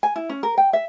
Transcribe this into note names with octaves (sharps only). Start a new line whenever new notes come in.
G#5
E4
C#4
A#4
G5
E5